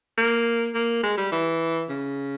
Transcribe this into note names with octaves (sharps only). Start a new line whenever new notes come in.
A#3
A#3
G#3
G3
E3
C#3